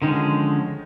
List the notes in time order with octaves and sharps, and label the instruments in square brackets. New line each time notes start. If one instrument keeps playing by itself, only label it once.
[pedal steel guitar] D3 F3 G#3 C#4 [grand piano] D#3 D#4